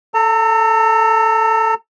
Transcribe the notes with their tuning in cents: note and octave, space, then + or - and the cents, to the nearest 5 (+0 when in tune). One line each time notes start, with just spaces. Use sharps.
A4 +0 A#5 -40